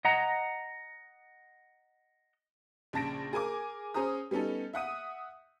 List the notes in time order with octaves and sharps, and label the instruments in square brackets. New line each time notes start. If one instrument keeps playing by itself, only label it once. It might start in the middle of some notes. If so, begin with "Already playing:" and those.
[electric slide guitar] D#5 F#5 A#5
[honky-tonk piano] A#1 C#3 A5 A#6 D7
G#4 A#4 G#5 D6
C#4 G#4 C5 A#5 D#6
G3 B3 C#4 D#4 A4
E5 F#5 D#6 D#7